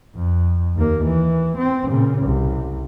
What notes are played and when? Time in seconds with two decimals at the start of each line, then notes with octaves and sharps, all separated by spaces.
0.16 F2
0.76 D#2 A#3
1.05 E3
1.57 C4
1.90 A#2 C#3
2.25 C2